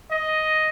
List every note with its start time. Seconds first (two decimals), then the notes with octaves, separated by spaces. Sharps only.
0.11 D#5